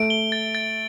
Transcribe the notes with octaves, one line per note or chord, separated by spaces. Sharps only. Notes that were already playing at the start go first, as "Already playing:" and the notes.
Already playing: A3 D7
G7
A6
A6